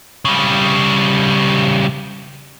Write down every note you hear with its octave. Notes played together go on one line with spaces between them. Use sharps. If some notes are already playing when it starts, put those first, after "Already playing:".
C#3 G3